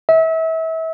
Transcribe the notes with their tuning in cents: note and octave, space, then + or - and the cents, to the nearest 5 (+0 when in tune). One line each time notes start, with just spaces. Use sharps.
E5 -30